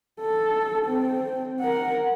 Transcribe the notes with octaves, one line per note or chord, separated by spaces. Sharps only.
A4
C4
A#4 F#5